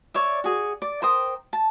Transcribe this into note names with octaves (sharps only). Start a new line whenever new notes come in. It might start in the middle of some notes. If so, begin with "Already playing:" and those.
C#5 D5 E5
F#4 G#4
D5
A#4 C5 G5 D#6
A5